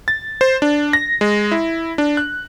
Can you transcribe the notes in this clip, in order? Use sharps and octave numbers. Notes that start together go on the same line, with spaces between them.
A6
C5
D4
A#6
G#3
E4
D4
F#6